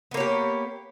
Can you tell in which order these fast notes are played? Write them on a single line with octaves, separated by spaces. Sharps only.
B3 A#3 C#5 G4